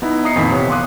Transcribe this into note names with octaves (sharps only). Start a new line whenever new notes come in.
B3 D#4 E4 A#5
D#5 A#5 D#6 C7 C#7
F2 A#2 D#3 E3 B6
C3 B3 C#5
F5 C6 D6 D#6 F#6